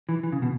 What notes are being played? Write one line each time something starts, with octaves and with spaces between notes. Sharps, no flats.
E3
E3
C#3
B2